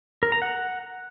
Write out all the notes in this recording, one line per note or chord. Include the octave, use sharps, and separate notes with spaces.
A#4
A#5
F#5